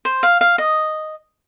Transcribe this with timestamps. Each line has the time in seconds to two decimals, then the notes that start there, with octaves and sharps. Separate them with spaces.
0.05 C5
0.23 F5
0.41 F5
0.58 D#5